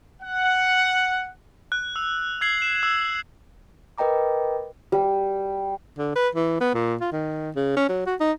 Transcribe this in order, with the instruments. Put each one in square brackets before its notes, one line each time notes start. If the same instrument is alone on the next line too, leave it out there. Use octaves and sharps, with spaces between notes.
[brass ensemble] F#5
[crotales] F#6
E6 F7
E6 G#6 C7 F#7
E7
E6
[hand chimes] A#4 B4 D#5 G5 A#5 D6
[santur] G3
[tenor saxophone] D3
B4
E3
B3
A#2
F4
D#3
C#3
C#4
F#3
F#4
D#4